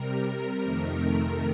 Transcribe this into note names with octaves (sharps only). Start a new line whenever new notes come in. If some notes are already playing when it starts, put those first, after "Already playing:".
Already playing: C3 G3 A#4
F2 C3 D#3 A3